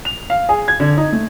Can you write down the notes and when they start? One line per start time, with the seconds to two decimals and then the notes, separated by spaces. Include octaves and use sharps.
0.05 F7
0.30 F5
0.49 G#4
0.68 G#6
0.80 D3
0.97 D#4
1.13 A3